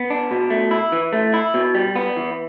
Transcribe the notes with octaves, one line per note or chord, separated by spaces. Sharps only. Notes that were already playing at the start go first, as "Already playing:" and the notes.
Already playing: B3
D4
B2
A3
E4
E3
A3
E4
B2
G3
B3
E3